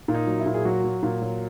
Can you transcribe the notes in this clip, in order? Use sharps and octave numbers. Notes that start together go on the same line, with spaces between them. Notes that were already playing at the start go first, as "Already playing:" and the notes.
A#2
D#4
F#3
E4
A#2
G#4
F#3 F#4
F#3
A#2
F#3